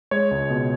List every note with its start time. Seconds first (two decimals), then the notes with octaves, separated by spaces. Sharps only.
0.11 G#3 C#5
0.31 C#2
0.50 B2